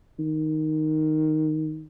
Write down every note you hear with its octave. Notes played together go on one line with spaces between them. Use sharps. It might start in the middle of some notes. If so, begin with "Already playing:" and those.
D#3